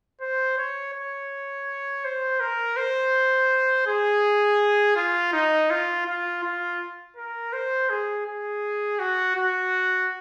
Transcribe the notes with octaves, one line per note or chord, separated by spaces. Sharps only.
C5
C#5
C#5
C5
A#4
C5
G#4
F4
D#4
F4
F4
F4
A#4
C5
G#4
G#4
F#4
F#4